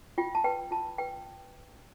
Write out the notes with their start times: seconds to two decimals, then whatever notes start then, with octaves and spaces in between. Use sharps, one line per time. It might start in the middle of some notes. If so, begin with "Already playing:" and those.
0.18 F4 G5
0.35 A5
0.44 B4 G5
0.71 F4 A5
0.98 B4 G5